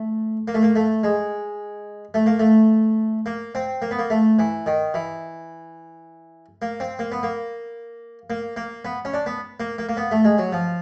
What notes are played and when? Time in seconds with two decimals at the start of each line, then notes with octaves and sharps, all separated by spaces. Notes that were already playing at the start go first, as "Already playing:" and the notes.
Already playing: A3
0.48 A#3
0.54 A3
0.63 A#3
0.76 A3
1.03 G#3
2.14 A3
2.26 A#3
2.39 A3
3.26 A#3
3.55 C4
3.82 A#3
3.91 B3
3.99 A#3
4.10 A3
4.39 E3
4.66 D#3
4.94 E3
6.62 A#3
6.80 C4
6.99 A#3
7.12 B3
7.23 A#3
8.30 A#3
8.57 A#3
8.85 B3
9.05 C#4
9.14 D4
9.26 B3
9.60 A#3
9.78 A#3
9.89 A#3
9.97 B3
10.11 A3
10.25 G#3
10.38 F#3
10.53 F3